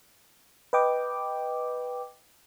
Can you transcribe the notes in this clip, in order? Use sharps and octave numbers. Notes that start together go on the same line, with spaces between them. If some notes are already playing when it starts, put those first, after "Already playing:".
B4 D#5 G5 D6